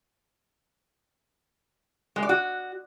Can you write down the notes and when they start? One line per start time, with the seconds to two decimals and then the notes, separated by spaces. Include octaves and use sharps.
2.16 G#3
2.23 D5
2.29 F#4